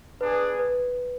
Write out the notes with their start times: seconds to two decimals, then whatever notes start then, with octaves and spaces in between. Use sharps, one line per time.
0.20 B3 D4 G#4 B4
0.59 B4